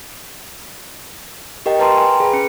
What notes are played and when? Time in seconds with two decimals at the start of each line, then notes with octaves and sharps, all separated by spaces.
1.66 G4 A#4 D#5 G5
1.79 B4 G5 A5 A#5 C6
1.98 G#5
2.20 G#4 B4 B5
2.33 C#4 C#7